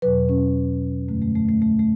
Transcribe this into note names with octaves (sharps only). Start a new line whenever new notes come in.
E2 B2 F#3 B4
C#4
F#2 D3 G#3 A3
A3
A3
A3
A3
A3